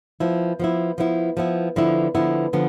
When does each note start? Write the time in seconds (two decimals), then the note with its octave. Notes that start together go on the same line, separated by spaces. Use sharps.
0.20 F3 B3 E4
0.60 F3 B3 E4
0.98 F3 B3 E4
1.37 F3 B3 E4
1.76 D3 F3 B3 E4
2.15 D3 F3 B3 E4
2.53 D3 F3 B3